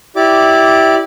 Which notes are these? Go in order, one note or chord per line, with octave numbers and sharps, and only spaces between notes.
E4 G4 D5 D6